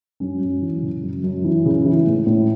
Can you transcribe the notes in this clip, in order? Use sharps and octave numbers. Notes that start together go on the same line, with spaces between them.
F#2 C#4
F#2
E3
C#3
F#2
F#2
E3
C#3
E3
A2
A2